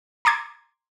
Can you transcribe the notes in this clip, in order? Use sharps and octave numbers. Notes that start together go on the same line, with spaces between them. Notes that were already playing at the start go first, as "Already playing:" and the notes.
A#5 C6 D6 G#6